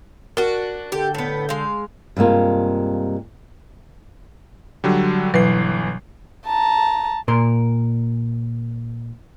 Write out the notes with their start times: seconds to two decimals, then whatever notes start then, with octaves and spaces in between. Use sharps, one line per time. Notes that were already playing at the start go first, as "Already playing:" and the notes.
0.37 D4 F#4 A#4
0.92 D3 G4 A4 G6
1.15 A2 B3
1.49 G#3 F5
2.17 G2 C3 G#3 A#3 F4
4.84 D3 F#3 G3
5.34 G1 B2 E3 F#3 B4 C7
6.46 A5 A#5
7.28 A#2 A#4 C6